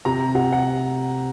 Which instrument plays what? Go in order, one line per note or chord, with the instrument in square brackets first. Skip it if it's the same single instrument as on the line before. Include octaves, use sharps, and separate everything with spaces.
[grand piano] C3 A#5
C3 F#5
F#5